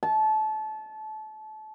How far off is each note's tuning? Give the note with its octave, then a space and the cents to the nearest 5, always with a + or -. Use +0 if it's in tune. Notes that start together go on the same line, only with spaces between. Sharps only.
A5 -25